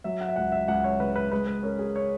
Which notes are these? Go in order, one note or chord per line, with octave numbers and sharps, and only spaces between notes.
F#3 E5
F#5
E5
C#2 F#5
E5
C#2 F#5
C#5
C#3 B4
B4
G#3 B4
B4
C#4 A#4
G#4
C#5